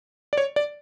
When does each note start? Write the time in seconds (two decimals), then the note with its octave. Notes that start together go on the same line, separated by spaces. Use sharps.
0.33 D5
0.38 C#5
0.56 D5